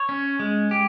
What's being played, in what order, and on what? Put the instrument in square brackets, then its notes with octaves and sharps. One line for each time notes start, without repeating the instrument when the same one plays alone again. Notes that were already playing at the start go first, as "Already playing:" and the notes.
Already playing: [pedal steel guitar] C#5
C#4
G#3
G4